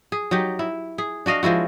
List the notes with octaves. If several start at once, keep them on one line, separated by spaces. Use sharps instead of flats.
G#4
F#3 D#4 G4
E4
G#4
D4 F#4 D#5 F5
F3 G#3 E4 F#4